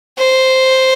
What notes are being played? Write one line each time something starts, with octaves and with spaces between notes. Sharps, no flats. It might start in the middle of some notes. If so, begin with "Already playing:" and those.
C5